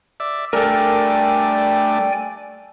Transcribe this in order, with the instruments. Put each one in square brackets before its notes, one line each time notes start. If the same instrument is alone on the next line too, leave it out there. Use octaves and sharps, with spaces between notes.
[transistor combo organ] D5 E5
[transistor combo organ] G3 A3 D4 [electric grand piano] A4 A#4 [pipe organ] D5 G5 G#5